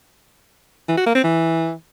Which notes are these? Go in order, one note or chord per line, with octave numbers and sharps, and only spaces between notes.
E3
F#4
A#3
C4
E3